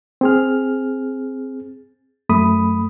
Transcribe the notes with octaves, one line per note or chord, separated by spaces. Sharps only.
C4 G#4 F6
F#2 A3 B5 D#6